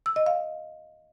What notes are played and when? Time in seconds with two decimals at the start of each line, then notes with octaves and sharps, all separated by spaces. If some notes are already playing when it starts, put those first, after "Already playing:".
0.06 E6
0.16 D#5
0.26 F5